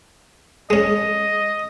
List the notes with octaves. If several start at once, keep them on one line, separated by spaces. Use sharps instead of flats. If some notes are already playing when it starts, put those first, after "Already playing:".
G#3 C#4 D#5